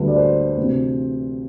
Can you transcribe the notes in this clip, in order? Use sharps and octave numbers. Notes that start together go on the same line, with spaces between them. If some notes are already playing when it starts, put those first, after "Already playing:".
Already playing: D2 D3 G3 B4
D5
C5
D2 C3 E3